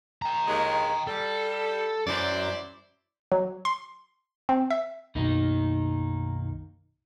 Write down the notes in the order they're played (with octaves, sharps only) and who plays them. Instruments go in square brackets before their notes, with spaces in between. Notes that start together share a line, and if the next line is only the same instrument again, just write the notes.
[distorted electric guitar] G5 A#5
[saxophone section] D#2 G#3
[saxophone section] G3 [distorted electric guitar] A4
[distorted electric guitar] F#2 F#3 [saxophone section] E4 C5 D5
[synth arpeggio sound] F#3
C6
C4
E5
[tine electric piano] B1 F#2 B2 [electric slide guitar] D#3 A#3 D#4